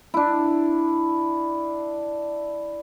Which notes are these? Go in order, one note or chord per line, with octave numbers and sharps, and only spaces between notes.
D4 E4